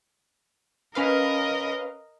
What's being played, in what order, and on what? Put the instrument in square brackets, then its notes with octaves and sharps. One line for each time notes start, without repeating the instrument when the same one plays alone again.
[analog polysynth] C#4 B4 F5 [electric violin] A#4 D#5